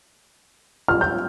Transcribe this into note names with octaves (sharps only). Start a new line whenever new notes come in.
F6
G6